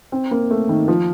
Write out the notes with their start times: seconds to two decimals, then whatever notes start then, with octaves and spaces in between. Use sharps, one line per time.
0.12 C4
0.31 A#3
0.51 A3
0.69 D#3
0.88 F3